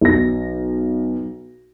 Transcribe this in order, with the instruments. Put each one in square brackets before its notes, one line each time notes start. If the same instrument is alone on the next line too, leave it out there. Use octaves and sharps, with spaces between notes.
[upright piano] B1 A#6